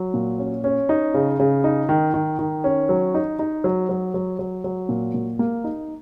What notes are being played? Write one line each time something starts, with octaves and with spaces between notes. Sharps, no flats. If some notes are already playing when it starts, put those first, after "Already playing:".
Already playing: F#3
A#2
C#4
C#4
D#4
C#3
C#3
D#4
D#3
D#3
D#3
C#4
F#3
D#4
D#4
F#3
F#3
F#3
F#3
F#3
A#2
A#2
A#3
D#4